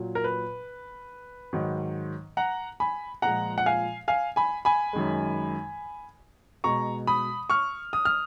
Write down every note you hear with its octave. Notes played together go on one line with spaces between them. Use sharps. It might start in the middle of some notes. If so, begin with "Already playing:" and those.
Already playing: A#2 F#3
A#4
B4
G#2 D#3 F#3
F#5 A#5
G#5 B5
A#2 F3 G#3 F#5 A#5
F#5
F5 G#5
F5 G#5
G#5 B5
G#5 B5
F#2 D#3 G#3
B2 G#3 A#5 C#6
B5 D#6
C#6 F6
D#6
F6